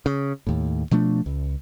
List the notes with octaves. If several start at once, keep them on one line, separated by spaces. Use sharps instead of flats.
C#3
D#2 A2
B2 F3 A3 D4
C#2